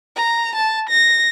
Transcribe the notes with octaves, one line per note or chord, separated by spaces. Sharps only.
A#5
A5
A#6